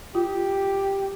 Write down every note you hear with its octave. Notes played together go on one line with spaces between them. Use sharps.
F4 G4